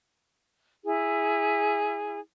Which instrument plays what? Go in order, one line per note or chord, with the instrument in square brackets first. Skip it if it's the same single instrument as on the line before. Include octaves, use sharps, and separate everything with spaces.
[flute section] E4 G#4